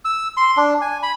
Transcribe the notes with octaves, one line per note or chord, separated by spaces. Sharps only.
E6
C6
D4
G#5
B5